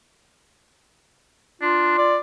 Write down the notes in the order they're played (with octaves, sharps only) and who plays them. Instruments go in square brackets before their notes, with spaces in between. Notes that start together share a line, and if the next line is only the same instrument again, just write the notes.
[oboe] D4 [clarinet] F4
[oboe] D5